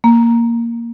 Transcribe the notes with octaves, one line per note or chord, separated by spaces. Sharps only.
A#3